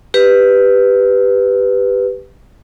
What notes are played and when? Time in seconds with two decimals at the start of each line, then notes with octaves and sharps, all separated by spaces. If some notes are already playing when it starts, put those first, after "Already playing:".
0.14 G4 B4